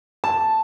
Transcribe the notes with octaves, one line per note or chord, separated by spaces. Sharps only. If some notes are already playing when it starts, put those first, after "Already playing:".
A5